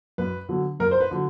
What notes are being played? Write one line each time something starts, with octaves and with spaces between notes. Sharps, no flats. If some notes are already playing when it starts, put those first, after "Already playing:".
F#2 B4
D3 F#3 B3
F#2 A#4
C5
B4
D3 F#3